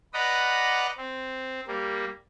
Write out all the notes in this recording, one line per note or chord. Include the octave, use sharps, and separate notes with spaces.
B4 D5 D#5 F#5 A#5 B5
C4
G3 A#3